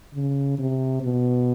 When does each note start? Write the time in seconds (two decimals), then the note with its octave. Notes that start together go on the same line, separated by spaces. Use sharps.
0.14 C#3
0.59 C3
1.02 B2